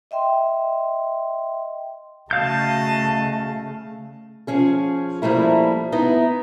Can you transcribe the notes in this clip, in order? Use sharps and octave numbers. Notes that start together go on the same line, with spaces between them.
D#5 E5 G5 C6
C#3 A3 F#4 D#5 F5 A5 G6
F3 C#4 G#4
F3 G3 A3 A#3 E4
B3 D#4 E4